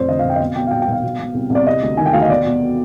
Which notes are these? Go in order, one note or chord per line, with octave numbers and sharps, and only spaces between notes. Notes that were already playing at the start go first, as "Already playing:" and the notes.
Already playing: F1 F2 C5 D5
D3 D#5
F1 F5
G5
D#5
B2 F5
B2 G5
F5
B1 G5
G5
B1 F5
B2
B2
C2
C2
D5
C3 D#5
D2
D#3 G#5
G5
D2 F5
D#5
B2 D5
B2